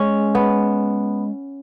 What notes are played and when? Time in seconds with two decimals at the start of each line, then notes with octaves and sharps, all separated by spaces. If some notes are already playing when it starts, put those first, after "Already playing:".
Already playing: G#3 C#4
0.35 B3